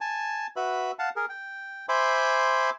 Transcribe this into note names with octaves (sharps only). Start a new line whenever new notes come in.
G#5 A5
F#4 B4 E5 B5
F5 F#5 A5
G#4 A#4
G5
C5 E5 G#5 B5 C6 D6